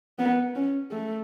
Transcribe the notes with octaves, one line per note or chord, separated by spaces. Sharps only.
B3
C#4
A3